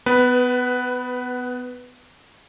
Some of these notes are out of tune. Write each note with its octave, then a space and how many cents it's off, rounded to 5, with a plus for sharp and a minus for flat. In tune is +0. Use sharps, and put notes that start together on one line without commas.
B3 +20 B4 +0